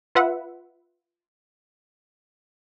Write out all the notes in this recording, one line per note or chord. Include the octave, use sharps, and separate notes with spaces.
F4 B4 E5 F#5